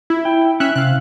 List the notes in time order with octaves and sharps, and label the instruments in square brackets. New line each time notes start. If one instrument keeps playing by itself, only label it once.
[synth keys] E4
[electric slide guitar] G5
[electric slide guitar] C#4 [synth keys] E5 F#6
[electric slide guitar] C3 [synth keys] F5 F#6